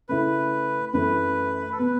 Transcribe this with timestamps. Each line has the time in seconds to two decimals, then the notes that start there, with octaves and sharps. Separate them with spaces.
0.09 C#3 A3 E4 B4
0.93 F#2 E3 A3 B4
1.72 A4
1.78 B2 B3 B4